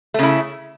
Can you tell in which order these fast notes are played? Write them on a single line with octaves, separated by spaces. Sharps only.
A3 C#3 E4